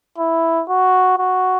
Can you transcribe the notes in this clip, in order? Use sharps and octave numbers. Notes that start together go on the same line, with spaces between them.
E4
F#4
F#4